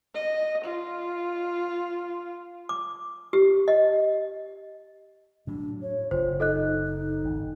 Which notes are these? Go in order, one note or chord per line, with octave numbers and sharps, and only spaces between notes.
D#5
F4
D6
G4
D#5
A2 F#3 D4
C#5
F#1 F4 C5
D#4 A4 D#5 F#6
D#4
G#1